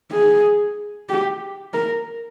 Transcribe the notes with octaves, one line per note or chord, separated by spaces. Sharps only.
G#4
G4
A#4